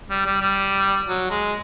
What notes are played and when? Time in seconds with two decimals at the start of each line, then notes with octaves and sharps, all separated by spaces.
0.10 G3
0.26 G3
0.41 G3
1.06 F#3
1.31 G#3